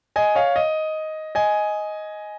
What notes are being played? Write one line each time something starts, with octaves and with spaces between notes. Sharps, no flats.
D#5 G#5
C#5 F5
D#5
D#5 G#5